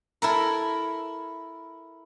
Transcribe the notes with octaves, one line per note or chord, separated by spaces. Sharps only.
E4 A4 A#4